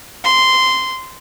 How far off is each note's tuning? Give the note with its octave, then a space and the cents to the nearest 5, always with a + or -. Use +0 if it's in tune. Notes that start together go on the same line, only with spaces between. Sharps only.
C6 -10